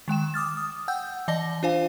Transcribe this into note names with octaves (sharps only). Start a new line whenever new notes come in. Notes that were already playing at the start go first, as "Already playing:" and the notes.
D#3 G#3 G5 E7
D6 D#6 F6 A6
D#6
F#5 G5 E6 G6
E3 D5 D#5 A5 A#6 G7
D4 F4 C5 F5 G#5